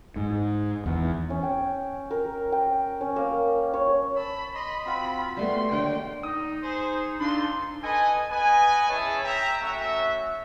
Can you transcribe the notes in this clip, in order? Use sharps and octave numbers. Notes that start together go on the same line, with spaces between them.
G#2
E2
C#4
G5
A#4
G5
C#4
A#3
C#5
A5 B5 E6
D#5 B5 C6
C4 F4 F#4 B5
G3 A3 B3 F#4 C6
D#2 D3 G5
D#4 D#6
G#4 C5
D4 D#4 F4 A4 C6
A4 B4 D#5 G#5
B3 B4 D#5 G#5
C#4 E4 G#4 C#5 E5 A5
E5 G5 A#5
A3 C#4 F#4 E5